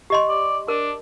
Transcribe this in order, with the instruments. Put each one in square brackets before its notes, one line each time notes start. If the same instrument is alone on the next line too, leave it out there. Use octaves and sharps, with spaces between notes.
[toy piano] G4 D#5 C6
[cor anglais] D5
[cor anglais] D4 [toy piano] A#4